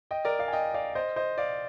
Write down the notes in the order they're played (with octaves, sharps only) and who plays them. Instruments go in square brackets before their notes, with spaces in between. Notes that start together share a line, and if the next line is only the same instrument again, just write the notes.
[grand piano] D#5 G5
A#4 D5
D5 F5
G#5
D#5 G5
D5 F5
C5 D#5
C5 D#5
D5 F5